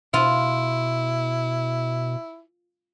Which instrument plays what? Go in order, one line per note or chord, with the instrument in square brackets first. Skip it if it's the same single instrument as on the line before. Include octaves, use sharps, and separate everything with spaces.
[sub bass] B2 [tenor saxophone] E4 [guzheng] F4